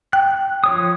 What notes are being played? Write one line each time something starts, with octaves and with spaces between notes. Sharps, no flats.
G5 F#6
F3 C#5 D#6